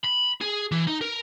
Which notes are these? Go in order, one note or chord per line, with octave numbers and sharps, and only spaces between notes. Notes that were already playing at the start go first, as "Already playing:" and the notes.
B5
G#4
E3
D#4
A#4